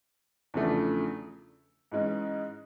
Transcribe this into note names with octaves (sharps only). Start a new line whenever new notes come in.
E2 C#3 F3 A3 D4
G#2 E3 G#3 C#4